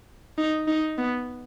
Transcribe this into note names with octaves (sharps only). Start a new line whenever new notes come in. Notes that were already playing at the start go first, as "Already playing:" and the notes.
D#4
D#4
B3